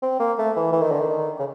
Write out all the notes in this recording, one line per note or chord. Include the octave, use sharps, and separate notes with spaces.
C4
A#3
A3
E3
E3
D#3
D3
D#3
C#3